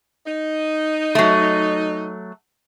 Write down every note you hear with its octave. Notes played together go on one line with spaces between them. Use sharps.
D#4
F#3 A3